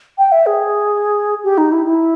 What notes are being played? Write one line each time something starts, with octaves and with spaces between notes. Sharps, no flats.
G5
E5
G#4
G4
D#4
E4
E4